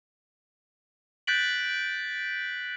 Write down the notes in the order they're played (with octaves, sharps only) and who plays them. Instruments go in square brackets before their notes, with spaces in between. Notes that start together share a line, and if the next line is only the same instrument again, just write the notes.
[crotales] F#6 G6 A6 B6 D7 F#7